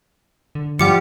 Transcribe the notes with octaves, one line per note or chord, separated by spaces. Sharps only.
D3
G2 F3 G3 F4 G4 F#5 D6 C#7